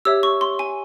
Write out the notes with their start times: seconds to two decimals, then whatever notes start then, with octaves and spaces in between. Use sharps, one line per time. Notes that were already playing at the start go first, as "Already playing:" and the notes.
0.05 G4 C#5 E5 E6
0.23 C#6
0.41 C6
0.59 G#5